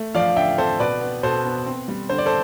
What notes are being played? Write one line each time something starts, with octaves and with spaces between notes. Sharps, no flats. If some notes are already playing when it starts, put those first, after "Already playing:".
Already playing: A3
F3 D5 F5
D3 E5 G5
C4 A4 C5
B2 B4 D5
B3
B2 A4 C5
B3
C4
G3
D3 C5
D5
A4 C5